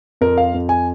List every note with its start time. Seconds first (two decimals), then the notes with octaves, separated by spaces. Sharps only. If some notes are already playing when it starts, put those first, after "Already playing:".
0.21 F2 A#4
0.38 F5
0.54 F2
0.69 G#5